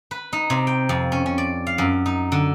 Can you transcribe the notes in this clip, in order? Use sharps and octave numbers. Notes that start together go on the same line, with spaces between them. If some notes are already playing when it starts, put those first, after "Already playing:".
B4
D#4
C3
G5
F2
C#4
C#4
D5
F5
F#2
D#4
D3